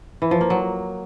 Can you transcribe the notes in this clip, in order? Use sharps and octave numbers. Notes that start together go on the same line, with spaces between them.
E3
F3
A#3
F#3